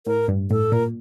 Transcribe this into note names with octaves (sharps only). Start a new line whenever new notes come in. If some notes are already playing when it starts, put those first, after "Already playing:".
A2 A#4
G2
A2 A4
A#2 A#4